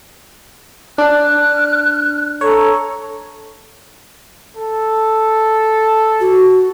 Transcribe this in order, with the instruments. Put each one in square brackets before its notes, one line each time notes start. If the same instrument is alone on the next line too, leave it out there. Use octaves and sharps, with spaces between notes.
[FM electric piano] D4 [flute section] F6 F#6
[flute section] A4 A#5 [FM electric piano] C#5
[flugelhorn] A4
[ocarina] F#4